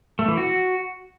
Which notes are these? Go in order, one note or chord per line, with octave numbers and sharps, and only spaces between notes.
A3
E3
F#4